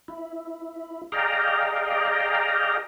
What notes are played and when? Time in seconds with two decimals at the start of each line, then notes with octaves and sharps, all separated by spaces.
0.08 E4
1.12 G#4 D5 D#5 F5 G5 A#5